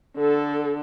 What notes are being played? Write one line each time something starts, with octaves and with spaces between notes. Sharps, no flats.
D3 A4